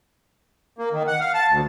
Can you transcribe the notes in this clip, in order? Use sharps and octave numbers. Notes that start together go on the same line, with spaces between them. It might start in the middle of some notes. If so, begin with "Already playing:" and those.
A#3
D#3
F#5
F5
A5
D2